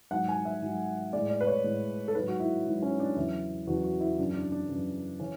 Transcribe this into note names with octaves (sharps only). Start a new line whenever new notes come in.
G#2 F#3 F#5
G#5
E5
G#2 F#3
A2 G#3 D5
D5
B4
C#5
A2 G#3
A4
G#2 F#3 B4
F#4
E4
G#2 F#3
C#4
D4
E2 C#3 F#3 E4
E2 C#3 F#3 F#4
F#4
E4
F#2 C#3 E3 D4
D4
D4
F#2 C#3 E3
C#3 E3 C#4